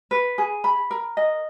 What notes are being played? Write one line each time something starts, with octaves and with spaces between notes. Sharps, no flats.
B4
G#4
B5
A#4
D#5